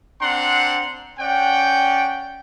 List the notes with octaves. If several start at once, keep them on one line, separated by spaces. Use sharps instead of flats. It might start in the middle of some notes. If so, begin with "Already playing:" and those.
C4 D4 F#5 A#5 C6
C#4 D5 F#5 G5